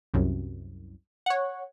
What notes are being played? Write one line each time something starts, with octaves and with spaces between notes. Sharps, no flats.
C2 F#2
C#5 F#5